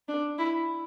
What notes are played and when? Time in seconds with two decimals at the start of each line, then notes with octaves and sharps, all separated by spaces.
0.08 D4
0.38 E4